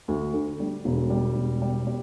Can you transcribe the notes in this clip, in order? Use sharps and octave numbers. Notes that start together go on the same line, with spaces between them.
D2
D3
G3
E1
G3
E1
G3
G3